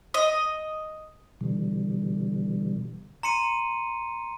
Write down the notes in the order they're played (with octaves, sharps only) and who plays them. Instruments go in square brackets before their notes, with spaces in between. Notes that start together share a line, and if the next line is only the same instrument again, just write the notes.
[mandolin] D#5
[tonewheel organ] B2 D3 E3 G3
[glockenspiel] A#5 C6 C#7 D#7